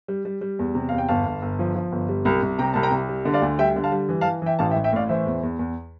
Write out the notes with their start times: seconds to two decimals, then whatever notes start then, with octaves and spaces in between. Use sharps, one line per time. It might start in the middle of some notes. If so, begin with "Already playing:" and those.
0.08 G3
0.25 G3
0.41 G3
0.59 E2
0.75 C3
0.89 E2 F5
0.98 G5
1.08 G1 F5 A5
1.26 G1
1.42 G1
1.59 F3
1.76 F3
1.92 G1
2.09 G3
2.25 C2
2.43 C2
2.59 C3 G5 A#5
2.74 C2 A5
2.83 G5 A#5
2.92 C2
3.09 G3
3.25 D3
3.34 D5 F5
3.42 D2
3.59 G3 E5 G5
3.76 D3
3.84 F5 A5
3.92 G3
4.09 E3
4.21 F5 A5
4.25 E3
4.42 E3 E5 G5
4.59 A1 F5 A5
4.71 E5 G5
4.76 A1
4.84 E5 G5
4.93 A2 D5 F5
5.09 E3 C5 E5
5.26 E2
5.43 E2
5.59 E2